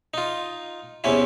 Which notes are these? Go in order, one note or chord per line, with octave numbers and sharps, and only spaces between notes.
D#4 F4
E2 C3 C4 C#4 E4